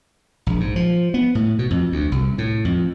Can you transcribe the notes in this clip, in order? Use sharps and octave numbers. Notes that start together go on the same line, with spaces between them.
A#1
G#2
F3
B3
A2
B2
F2
D2
C2
A2
F2